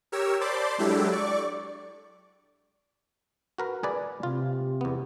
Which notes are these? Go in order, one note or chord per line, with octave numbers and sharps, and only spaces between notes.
G4 A#4 C#5 E6
C5 D5 A5 B5 C6 D6
F#3 G#3 D4 E4 G4 A4
D5 C#6 D6
F#4 A#4 B4
G#4 B4 D5
C3 F4
E2 B3